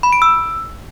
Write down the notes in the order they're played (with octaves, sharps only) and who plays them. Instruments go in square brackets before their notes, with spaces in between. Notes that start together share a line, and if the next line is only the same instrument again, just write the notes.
[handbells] B5
D7
E6